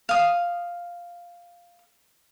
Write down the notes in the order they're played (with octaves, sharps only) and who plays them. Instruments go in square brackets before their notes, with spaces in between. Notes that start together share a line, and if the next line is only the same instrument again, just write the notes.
[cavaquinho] F5 D#6